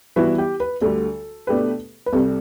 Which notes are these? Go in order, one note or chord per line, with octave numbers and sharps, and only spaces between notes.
E3 G3 B3 E4 F#4 B4
G4
B4
D2 D3 G3 A4
B2 A3 D4 G4 B4
B4
C2 C3 G3 A4